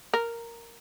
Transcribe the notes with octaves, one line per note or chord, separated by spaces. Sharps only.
A#4